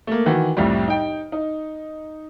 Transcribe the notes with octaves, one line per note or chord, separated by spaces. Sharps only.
A3 A#3
D#3 E3 F#4
C2 F2 A2 G3
D#4 G5
D#4